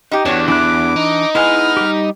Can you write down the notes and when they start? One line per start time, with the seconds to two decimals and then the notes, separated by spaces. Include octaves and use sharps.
0.11 D#4 G4
0.25 E2 D4 F#4 C#5
0.48 E3 D4 E4 D6 F#6
0.96 D#4
1.35 G#3 B3 E4 G#5 F6
1.77 G3 G4